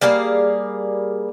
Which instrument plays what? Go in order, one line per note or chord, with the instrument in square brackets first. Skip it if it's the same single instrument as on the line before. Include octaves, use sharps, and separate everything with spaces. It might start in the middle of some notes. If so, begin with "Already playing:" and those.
[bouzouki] G3 A#3 G#4 F5